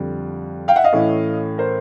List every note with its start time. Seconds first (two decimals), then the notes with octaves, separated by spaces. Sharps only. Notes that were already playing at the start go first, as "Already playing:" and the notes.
Already playing: F2 D3 G3
0.68 F5 G5
0.76 E5 F#5
0.84 D#5 F5
0.93 A2 E3 A3 C#4 E4
1.58 A#4 C5